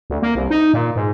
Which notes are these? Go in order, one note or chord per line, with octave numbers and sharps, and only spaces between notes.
D2
A#3
C2
D#4
A#2
G#2